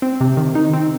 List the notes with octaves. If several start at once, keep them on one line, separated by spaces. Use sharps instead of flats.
C4
C3
D#3
D#4
C4